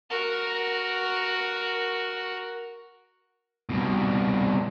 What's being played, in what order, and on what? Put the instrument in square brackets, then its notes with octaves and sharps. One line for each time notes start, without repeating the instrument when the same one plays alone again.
[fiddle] F#4 A#4
[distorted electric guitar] C2 B2